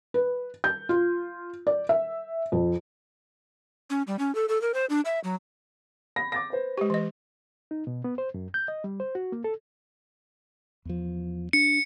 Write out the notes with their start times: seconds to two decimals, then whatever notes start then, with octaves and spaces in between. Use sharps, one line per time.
0.14 B4
0.64 G6
0.89 F4
1.67 D5
1.89 E5
2.52 F2
3.90 C#4
4.07 G3
4.19 C#4
4.35 A4
4.49 A4
4.62 A#4
4.74 C5
4.90 D4
5.05 E5
5.24 F#3
6.16 B5 A#6
6.32 D6 A6 A#6
6.50 B4 C5
6.78 G#3 G4
6.90 E3 D#5
7.71 D#4
7.87 B2
8.04 B3
8.18 C5
8.34 F#2
8.54 G6
8.68 D#5
8.84 G3
9.00 C5
9.15 F#4
9.32 A#3
9.44 A4
10.85 E2 F3
11.53 D4 C#7